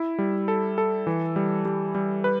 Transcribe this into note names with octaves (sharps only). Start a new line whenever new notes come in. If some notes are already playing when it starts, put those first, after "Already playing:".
Already playing: E4
G3
A4
A4
E3
G3
G3
G3
B4